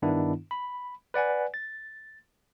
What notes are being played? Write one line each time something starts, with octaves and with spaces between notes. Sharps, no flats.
G2 D#3 B3 D4 E4
B5
B4 D5 F#5 G#5
A6